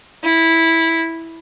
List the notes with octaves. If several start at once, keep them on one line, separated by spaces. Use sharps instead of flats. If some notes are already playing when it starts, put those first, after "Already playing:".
E4